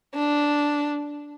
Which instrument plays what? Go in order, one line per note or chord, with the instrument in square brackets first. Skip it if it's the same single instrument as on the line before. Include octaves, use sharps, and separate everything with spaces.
[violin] D4